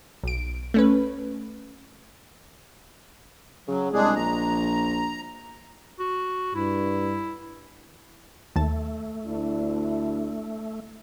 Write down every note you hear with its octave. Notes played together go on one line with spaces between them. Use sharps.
B1 D7
A3 C#4 B4
C#3 F#3
C2 G#3 D4 G#4
A#1 A#5
F#4
G2 E4
D#2 A3 A5
D2 D4 E4